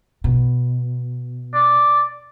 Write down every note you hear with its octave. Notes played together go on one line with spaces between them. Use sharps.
B2
D5